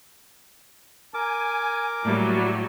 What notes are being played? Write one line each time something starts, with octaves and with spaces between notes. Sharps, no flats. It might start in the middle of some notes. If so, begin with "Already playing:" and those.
A#4 G#5 D6
A2 F#3 G3 A3 A#3 D5